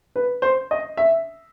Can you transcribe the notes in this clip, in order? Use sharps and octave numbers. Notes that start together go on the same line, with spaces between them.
B4
C5
D#5
E5